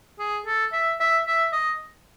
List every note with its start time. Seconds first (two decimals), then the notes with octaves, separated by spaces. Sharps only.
0.19 G#4
0.46 A4
0.73 E5
1.00 E5
1.27 E5
1.53 D#5